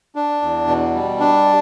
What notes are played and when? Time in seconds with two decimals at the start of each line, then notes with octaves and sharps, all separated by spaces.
0.15 D4
0.42 E2
0.68 B2
0.95 G3
1.20 D4